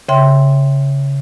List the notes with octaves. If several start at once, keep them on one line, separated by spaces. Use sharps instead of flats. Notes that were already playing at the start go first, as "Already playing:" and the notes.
C#3 E5 G5 C6